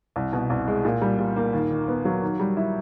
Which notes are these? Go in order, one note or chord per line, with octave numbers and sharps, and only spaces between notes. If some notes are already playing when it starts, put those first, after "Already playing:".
C2
B2
C2
G#3
A#2
G3
A#2
A#3
D#2
D#3
B3
F#3
D#3
G3
E4